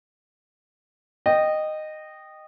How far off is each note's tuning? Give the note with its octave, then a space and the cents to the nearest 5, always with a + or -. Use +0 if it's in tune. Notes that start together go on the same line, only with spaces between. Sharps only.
D#5 -10 G5 -5